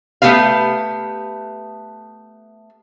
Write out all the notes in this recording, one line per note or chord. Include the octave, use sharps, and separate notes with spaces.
A3 B3 G4 B4 F5